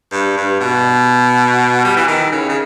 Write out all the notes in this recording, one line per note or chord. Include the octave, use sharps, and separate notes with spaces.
G2
G2
B2
G3
E3
D#3
C#3
C#3